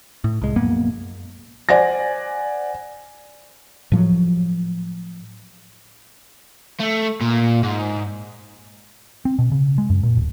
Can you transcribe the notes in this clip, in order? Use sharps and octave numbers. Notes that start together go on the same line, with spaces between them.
A2
C2 G#3
A#1 F#2 A#3 B3
C5 D5 F#5 G#5 A#6
A2 F3 F#3
A3
A#2
G#2
C4
B2
C#3
G#3
F#2
A#2
D1